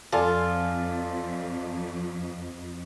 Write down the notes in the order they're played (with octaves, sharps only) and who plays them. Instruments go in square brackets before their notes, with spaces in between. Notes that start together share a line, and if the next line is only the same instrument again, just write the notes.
[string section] F2 [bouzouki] F4 [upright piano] A4 D5 G#5